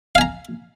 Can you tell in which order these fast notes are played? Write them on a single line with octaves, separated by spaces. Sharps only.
F5 G#5 A#5